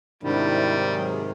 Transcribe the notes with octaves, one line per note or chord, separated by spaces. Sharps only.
G#2 C3 D#3 G3 D4 E4
F#3 G#4